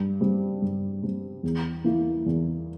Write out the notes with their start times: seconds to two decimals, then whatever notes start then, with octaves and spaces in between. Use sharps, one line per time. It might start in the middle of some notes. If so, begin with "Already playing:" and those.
Already playing: G2
0.21 G3 C4
0.62 G2
1.03 G3 C4
1.43 E2
1.84 E3 A#3 E4
2.26 E2